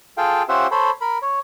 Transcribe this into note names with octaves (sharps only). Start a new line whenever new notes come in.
F4 G#4 A4 F5 G5
C#4 F4 G4 C5 E5 F#5
A4 C5 C#5 B5
A#4 B5
C#5